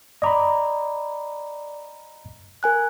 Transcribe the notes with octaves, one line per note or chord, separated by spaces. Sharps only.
D5 D#5 A#5 B5 D6
A#4 G#5 F#6